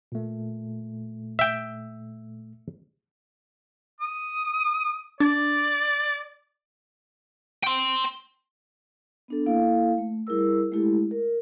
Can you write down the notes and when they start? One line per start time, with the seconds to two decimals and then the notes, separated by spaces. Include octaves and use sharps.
0.12 A#2 A3
1.39 E5 G5
4.01 D#6
5.20 D4 D5
7.64 G5 C6
9.28 B3 D4 A4
9.46 A#3 E4 A4 F5
9.98 A3
10.27 G3 E4 G#4 A#4 E6
10.72 G#3 A3 E4 G4 A4
11.11 A#4